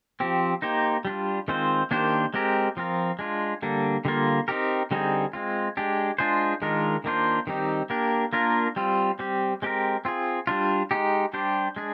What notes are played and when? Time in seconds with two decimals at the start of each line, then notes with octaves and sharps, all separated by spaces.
0.20 F3 C4 G4
0.62 A#3 D#4 G4 C5
1.05 G3 D4 F4
1.48 D#3 G#3 C4 F4 C5
1.91 D#3 A#3 D4 G4 C5
2.34 G#3 C4 G4 A#4
2.77 F3 C4 F4 A#4
3.19 G#3 D4 F4
3.62 D3 G3 A#3 D4
4.05 D3 G3 A#3 F4
4.48 C4 D#4 G4 A#4
4.91 D3 G3 C4 D#4 G#4
5.33 G#3 C4 F4
5.77 G#3 D4 G4
6.19 G#3 D4 F4 G#4 C5
6.62 D#3 G#3 D4 F4 A#4
7.04 D#3 A#3 D4 F4 C5
7.47 D#3 G3 C4 D#4 G4
7.90 A#3 D4 G4 A#4
8.33 A#3 D4 F4 A#4
8.76 G3 C4 F4
9.19 G3 C4 G4
9.62 G#3 C4 G4 A#4
10.05 C4 F4 G#4
10.47 G3 D4 F4
10.91 G#3 D#4 G4
11.33 G3 D4 G4 C5
11.76 G#3 D4 G#4